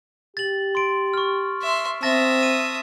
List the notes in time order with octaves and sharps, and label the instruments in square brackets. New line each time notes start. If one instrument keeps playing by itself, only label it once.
[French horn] G4 [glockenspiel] A6 F#7
[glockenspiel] C6 D7
C#6 F6
[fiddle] E5 C6
[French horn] C4 [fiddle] E5 D#6 [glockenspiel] A5 A6 A#6
[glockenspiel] D#7